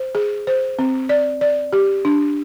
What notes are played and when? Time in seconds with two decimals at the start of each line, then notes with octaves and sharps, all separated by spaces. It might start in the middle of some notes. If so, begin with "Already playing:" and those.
Already playing: C5
0.15 G#4
0.47 C5
0.79 C4
1.09 D5
1.41 D5
1.73 G4
2.05 D4